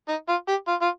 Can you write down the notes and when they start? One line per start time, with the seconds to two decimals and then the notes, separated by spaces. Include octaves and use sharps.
0.08 D#4
0.29 F4
0.48 G4
0.68 F4
0.82 F4